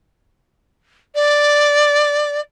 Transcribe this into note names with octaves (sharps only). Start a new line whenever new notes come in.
D5